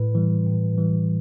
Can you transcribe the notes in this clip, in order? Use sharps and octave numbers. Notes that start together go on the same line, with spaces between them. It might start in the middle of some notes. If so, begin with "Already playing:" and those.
Already playing: A2 B4
E3 G3
A2
E3 G3